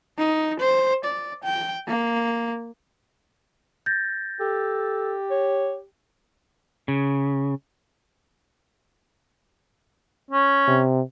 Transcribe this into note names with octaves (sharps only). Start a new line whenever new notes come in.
D#4
C5
D5
G5
A#3
G6 A6 A#6
G4 A4
C#5
C#3
C#4
C3